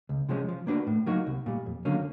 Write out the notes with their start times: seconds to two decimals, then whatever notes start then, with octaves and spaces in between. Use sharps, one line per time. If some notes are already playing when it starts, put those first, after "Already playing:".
0.09 C#2
0.29 C3 F3 G#3 C#4
0.49 F3
0.67 A#3 D4 F#4 B4
0.87 A2
1.06 F#3 A#3 D#4 F#4
1.27 C2
1.46 A#2 G3
1.66 F2
1.85 D3 F#3 A#3 C#4